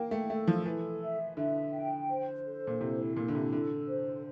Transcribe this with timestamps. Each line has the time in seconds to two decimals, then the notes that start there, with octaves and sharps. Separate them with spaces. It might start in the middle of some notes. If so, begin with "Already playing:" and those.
Already playing: A#3 G5
0.11 A3
0.29 A3 A4
0.48 F3
0.65 E3 A4
1.02 E5
1.37 D3 E5
1.73 G5
2.09 C5
2.45 A4
2.67 A#2
2.80 C3 E4
3.16 A#2 A4
3.28 D3
3.35 C3
3.52 D3 A4
3.88 C5